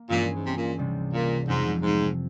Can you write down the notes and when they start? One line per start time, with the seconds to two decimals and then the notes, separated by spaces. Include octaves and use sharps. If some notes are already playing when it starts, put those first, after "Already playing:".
Already playing: A#3
0.09 G2 A#2 E3 G#3 C#4 E4
0.33 G#2
0.44 C3
0.55 A#2
0.77 C#2 C3 G3 C4
1.13 A#2
1.48 F2 G#2 C3 F3 C4 F4
1.82 G#2